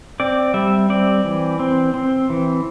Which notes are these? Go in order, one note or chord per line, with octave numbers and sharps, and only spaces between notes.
C4 D5
G3 E5
C4 D5
E3
C4
C4
E3